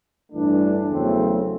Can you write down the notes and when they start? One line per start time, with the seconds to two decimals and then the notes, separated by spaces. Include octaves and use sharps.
0.31 A1 G2 E3 A3 D4
0.90 E2 C#3 F#3 A3 C4